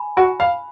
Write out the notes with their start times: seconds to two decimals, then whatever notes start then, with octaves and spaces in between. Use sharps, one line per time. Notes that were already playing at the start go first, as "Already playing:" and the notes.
Already playing: G#5 B5
0.17 F#4 B5
0.39 F5 B5